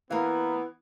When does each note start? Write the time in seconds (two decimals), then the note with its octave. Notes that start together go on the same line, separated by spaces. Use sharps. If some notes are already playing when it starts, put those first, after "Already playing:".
0.11 E3 A#3 B3 F5